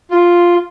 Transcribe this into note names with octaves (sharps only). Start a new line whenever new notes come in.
F4